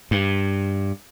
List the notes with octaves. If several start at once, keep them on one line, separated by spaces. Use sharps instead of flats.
G2